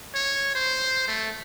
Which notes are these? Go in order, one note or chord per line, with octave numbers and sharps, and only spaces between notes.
C#5
C5
A3